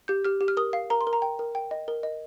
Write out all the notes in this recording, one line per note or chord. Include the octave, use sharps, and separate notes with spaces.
G4 G6
G4 F6
G4
F6
A#4 D#6
F5
A#4 A#5
C6
A#4
A#5
G5
A#4
G5
D#5
A#4
D#5